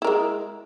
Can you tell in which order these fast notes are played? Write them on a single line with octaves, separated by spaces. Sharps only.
E4 A#4 G#3